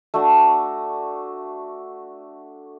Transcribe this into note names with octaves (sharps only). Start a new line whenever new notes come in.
A3 D4 F#4 F#5